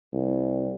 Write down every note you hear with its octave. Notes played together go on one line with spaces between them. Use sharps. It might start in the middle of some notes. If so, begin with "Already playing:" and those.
C2